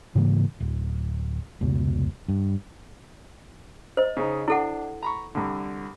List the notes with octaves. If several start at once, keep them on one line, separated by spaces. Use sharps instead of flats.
G#2 C#3 E3 A#3
D1
F1 C#2 B2
G2
C5 D#5
C#3 D#4
D4 E4 A4 F#5 D6
A#5 B5 C#6
C2 D3